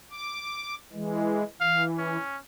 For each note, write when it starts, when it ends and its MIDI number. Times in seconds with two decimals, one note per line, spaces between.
0.11 0.75 86
0.92 1.43 52
0.92 1.43 56
1.61 2.17 52
1.61 1.84 77
1.98 2.37 61